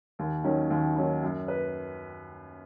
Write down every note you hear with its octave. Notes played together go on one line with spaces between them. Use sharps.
D#2
D#3 F#3 C#4
D#2
D#3 F#3 C#4
F#2
B4